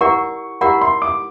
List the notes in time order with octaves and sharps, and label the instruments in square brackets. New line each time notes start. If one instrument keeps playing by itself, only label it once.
[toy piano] E4 G4 A#4 D5 F#5 [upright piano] C#6
[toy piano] E4 G4 A#4 D5 F#5 [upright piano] B5
[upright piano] C6
D6